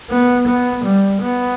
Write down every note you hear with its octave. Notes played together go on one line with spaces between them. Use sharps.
B3
B3
G3
B3